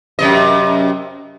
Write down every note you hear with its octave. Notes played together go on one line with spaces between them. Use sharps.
F#2 C3 D#5